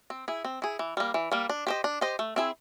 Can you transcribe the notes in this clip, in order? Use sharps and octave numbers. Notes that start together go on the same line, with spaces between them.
C4
E4 G#4
C4
E4 G#4
E3
G3 A#3
E3
G3 A#3
D4
G4 C5 D#5
D4
G4 C5 D#5
A3
C4 E4 G#4